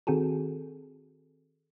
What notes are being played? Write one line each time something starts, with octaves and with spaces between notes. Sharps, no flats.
D#3 C4 F#4 G#4 A4